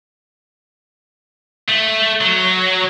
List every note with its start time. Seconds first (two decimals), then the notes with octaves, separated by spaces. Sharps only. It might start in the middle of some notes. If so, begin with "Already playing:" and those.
1.69 A3
2.21 F#3